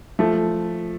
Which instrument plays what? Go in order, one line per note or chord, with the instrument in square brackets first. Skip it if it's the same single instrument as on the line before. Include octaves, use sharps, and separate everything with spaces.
[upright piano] F3 A3